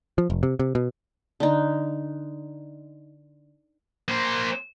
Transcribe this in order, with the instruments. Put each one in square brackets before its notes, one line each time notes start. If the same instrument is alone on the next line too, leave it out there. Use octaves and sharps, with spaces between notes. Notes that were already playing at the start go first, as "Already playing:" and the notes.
[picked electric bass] F3
F1
C3
C3
B2
[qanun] D3 D#4
[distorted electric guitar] A#3 C5